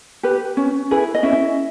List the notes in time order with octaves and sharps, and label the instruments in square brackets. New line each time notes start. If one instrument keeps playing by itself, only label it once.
[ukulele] G4 B4
C#4
E4 G#4 B4
D#5
C#4 E4 E5